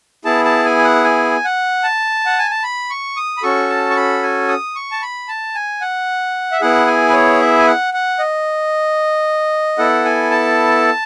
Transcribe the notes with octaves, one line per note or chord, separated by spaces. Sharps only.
B3 E4 G#4 A5
A5
G#5
F#5
G#5
F#5
A5
F#5
G#5
A5
B5
C#6
D#6
B5
C#4 F#4 A4 C#6
A5
C#6
B5
G#5
D#6
C#6
A5
B5
A5
G#5
F#5
E5
B3 E4 G#4 F#5
G#5
B4
C#5
E5
G#5
F#5
F#5
D#5
B3 E4 A4 F#5
G#5
A5